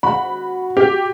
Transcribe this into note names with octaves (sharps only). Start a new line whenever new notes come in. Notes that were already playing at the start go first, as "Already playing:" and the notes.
F#4 B5
G4